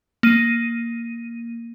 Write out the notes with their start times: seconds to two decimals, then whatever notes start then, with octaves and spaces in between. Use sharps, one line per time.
0.23 A#3 D#7